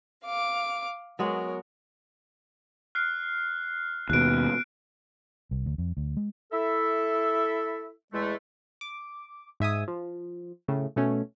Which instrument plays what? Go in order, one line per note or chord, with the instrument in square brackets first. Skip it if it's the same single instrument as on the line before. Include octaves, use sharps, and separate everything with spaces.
[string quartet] F5 D6
[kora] F#3 G#3 B3 [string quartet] A#4 C#5
[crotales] F6 F#6 C7
[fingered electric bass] D#2 B2 [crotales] F#6 D7
[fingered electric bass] C2
D2
F2
D2
G#3
[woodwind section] E4 A4 E5
E2 G#3 A3
[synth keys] D6
G#2 E5 G#5 D#6
F3
A2 C#3 A3
B2 A3 C#4